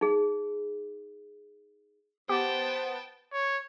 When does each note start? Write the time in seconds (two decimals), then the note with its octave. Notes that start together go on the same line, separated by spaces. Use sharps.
0.01 D#4 G#4
2.29 B3 G4 C5 G5 A5
3.33 C#5